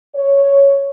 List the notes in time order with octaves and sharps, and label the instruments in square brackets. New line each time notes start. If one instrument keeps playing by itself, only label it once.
[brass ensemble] C#5